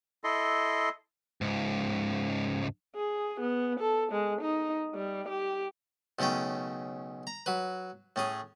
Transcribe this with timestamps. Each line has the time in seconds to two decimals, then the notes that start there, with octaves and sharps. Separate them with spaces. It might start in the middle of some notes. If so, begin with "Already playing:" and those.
0.24 E4 A4 D#5 C6
1.41 C#2 G#2
2.95 G#4
3.41 B3
3.80 A4
4.12 G#3
4.41 D#4
4.95 G3
5.29 G4
6.19 B1 C#3 A3 C#4 G5
7.27 A#5
7.46 F#3 B4
8.16 A2 C#4 G#4